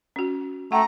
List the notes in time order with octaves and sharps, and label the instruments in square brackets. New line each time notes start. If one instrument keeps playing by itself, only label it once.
[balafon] C#4 F#4
[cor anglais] A3 [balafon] F#5 G5 [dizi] A#5